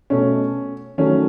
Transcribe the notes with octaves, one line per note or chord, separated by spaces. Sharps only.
B2 A3 C#4
D#3 F#3 A3 C#4